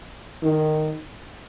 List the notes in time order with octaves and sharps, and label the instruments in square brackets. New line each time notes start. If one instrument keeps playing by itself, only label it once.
[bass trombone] D#3